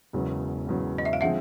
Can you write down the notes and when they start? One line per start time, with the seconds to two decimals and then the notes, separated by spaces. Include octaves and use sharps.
0.13 E1 E2 C#3 F#3
0.67 E1 E2 C#3 F#3
0.98 D#5
1.05 E5
1.13 F5
1.21 D3 F3 G#3 C4 E5 F#5